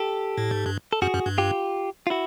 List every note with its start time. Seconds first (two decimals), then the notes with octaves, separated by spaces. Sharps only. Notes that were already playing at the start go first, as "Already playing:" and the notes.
Already playing: G4 A4
0.38 A2
0.51 G#2
0.66 G2
0.93 A4
1.02 F#2 F#4 G#4
1.14 F#2
1.26 G2
1.38 F4 G4
2.07 F4
2.10 E4 F#4